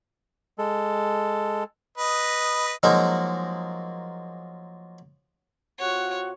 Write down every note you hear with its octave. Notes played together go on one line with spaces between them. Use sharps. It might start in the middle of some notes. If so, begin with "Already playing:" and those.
G#3 A4
B4 D#5
F3 F#3 G#3 A#3 D#4
C3 F4 F#4 C#5 F#5